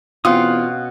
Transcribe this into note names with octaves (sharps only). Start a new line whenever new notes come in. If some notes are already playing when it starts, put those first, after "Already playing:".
E2 B2 C4 C#4 F4 F5 F#5 D#6